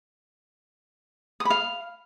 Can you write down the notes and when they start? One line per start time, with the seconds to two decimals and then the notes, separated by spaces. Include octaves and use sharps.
1.40 D#6
1.45 B5
1.50 F5